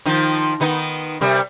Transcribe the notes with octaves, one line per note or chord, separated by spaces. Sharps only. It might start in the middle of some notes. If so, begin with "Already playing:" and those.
D#3 F3 D#4
D#3 B3 D#4
C3 G3 A#4